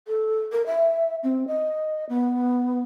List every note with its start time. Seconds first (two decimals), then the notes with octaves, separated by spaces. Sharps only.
0.08 A4
0.52 A#4
0.66 E5
1.24 C4
1.47 D#5
2.09 B3